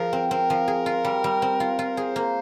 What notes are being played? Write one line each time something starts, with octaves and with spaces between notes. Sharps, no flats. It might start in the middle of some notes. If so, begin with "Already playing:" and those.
Already playing: F3 G#4 A#4
C4
C4 A#4
F3
G#4
F4
G3
G3
C4
F4
F4
G#4 C5
A#3